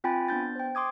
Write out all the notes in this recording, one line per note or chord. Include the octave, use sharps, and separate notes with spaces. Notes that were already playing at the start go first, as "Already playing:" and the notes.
C4 F4 G5 G#5 B5 A6
B3 D4 G6 A6
C5 G5
C6 D6 D#6 G#6